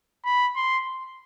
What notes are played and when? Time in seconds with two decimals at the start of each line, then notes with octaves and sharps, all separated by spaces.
0.25 B5
0.56 C6